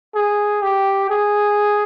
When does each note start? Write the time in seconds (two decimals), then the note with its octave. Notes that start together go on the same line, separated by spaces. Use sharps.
0.15 G#4
0.62 G4
1.10 G#4